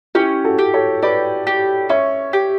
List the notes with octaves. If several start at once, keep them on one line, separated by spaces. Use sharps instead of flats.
C#4 E4 G4
F#4 A4
G4
A4 C#5
G4 B4 D5
G4
C#4 C#5 E5
G4